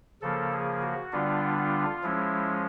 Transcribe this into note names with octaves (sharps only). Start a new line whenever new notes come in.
C#3 F3 A#3 A4
G#4
F#4
D3 G3 B3 D4 F4
F4
F3 G#3 C#4 E4